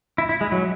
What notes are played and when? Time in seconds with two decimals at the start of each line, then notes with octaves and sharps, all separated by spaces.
0.18 E4
0.29 E4
0.41 G#3
0.52 F#3